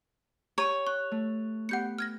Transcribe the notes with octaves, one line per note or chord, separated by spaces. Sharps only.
G4 C#5 A#5 C#6 D#7
C#6 F#6
A3
B3 G4 F#5 G6 C#7
F6 G#6 A#6